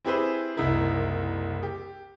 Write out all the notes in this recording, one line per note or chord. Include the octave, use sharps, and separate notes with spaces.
C4 E4 G4 G#4 B4 C5
F#1 C2 D#4 E4 A#4
G4